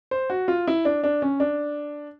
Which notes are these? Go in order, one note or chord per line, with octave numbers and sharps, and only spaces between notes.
C5
F#4
F4
E4
D4
D4
C#4
D4